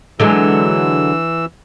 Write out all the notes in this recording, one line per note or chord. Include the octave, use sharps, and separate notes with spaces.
D3 E3 F#3 G#3 E6